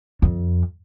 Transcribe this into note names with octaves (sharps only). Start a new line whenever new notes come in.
F2